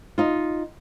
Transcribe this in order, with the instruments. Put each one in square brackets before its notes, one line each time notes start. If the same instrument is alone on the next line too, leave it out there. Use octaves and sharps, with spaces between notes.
[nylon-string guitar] D#4 F4